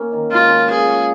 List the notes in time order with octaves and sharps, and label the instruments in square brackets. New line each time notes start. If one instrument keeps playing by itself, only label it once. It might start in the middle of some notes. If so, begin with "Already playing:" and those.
Already playing: [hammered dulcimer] A#3 C#4
D#3
[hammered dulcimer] G#3 [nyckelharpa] F4
[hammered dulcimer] C#3
[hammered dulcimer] F4 [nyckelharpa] G#4
[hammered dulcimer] C#5